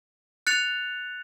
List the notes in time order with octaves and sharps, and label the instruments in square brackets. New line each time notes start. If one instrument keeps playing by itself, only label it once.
[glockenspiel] F#6 A6 C#7 F7